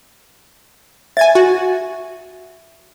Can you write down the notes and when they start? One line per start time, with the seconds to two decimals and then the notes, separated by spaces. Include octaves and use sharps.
1.17 E5 G#5 G#6 A6
1.35 F#4